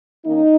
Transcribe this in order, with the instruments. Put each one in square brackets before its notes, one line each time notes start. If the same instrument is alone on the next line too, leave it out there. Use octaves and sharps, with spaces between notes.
[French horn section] D#3 A#3 C#4 D#4